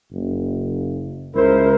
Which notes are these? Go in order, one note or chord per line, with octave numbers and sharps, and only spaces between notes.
F#1
C#2 E4 A#4 C5